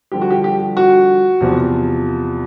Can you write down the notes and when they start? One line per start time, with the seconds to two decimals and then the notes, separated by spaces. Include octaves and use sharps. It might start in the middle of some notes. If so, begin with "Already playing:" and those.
0.12 G2 D3 F3 G4
0.21 F#4
0.30 G4
0.44 G4
0.77 F#4
1.41 E2 C3 F3